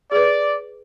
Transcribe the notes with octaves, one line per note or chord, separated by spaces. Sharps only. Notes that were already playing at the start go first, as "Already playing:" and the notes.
G#4 B4 D5